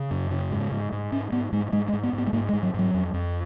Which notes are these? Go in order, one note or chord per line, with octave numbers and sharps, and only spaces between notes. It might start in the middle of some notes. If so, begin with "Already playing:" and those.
Already playing: C#3
F#2
C#3
G#2
G#2
G#2
G#2 C#4
G#2 B3
G#2 G#3
G#2 G#3
G#3
G#2
B3
G#2
B3
G#3
G#2 A#3
G#3
G#2
F#3
G#2 F#3
F2
F2